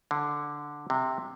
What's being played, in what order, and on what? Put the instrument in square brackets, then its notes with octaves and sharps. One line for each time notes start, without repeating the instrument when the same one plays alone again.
[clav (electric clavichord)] D3
C3